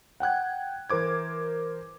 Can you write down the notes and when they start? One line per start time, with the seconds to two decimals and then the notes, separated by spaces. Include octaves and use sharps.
0.20 F#5 G5 F#6 G#6
0.90 E3 A#4 C5 D6 G#6